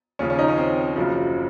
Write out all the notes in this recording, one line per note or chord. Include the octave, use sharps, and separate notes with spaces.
D#2 C#3 F3 C#4
C#4
D#4
C#4
C4
F#1 F#2 C#3 F3